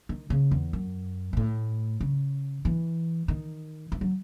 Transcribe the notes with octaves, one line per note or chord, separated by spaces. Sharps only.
D#3
C#3
E2
F#2
B2
A2
C#3
E3
D#3
E3
F#3